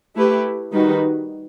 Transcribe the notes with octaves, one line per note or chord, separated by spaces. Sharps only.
A3 E4 G4 B4
D#3 G3 D#4 F#4 B4